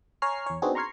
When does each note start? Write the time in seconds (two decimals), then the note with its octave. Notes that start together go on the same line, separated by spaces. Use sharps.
0.22 C#5 G#5 A#5 C#6 F6 C7
0.46 E2 C#5
0.62 B3 C4 D4 D#4 F#4 G#4
0.75 A#5 C6 C#6 F6 G#6 C7